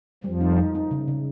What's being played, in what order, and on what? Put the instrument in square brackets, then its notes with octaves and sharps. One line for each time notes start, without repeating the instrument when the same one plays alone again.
[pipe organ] F2 F3 [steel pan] G3
[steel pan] D#4
D#4
D#4
C#3
C#3